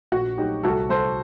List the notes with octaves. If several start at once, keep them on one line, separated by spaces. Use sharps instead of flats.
A#1 F#4
F#3 D#4 G4
C2 F#4 A4
C2 A4 C5